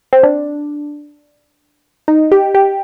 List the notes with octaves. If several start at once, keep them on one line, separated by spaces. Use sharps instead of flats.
C4
D4
D#4
G4
G4